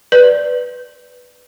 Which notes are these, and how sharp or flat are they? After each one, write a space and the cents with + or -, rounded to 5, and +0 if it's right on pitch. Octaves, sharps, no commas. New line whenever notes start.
B4 +0 D5 +0